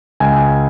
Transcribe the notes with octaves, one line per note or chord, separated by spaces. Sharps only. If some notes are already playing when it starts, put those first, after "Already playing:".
C#2 G#5